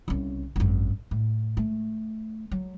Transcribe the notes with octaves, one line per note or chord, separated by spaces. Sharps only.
C2 C#3
G#1 F#2
A2
A3
F#3